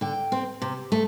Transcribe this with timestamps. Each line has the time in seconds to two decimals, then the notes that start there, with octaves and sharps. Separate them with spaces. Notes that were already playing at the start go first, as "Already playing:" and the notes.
0.01 D3 G5
0.32 C4
0.62 C3
0.92 A3